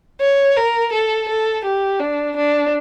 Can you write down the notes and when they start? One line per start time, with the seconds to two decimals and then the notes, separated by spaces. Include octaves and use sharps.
0.21 C#5
0.56 A#4
0.93 A4
1.28 A4
1.65 G4
2.00 D4
2.37 D4